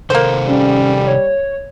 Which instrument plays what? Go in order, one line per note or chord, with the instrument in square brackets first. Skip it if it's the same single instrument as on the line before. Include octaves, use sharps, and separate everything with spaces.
[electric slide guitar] C3 D#3 A4 [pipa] A#3 C5
[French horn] G3 [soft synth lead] C#4
[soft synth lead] C#5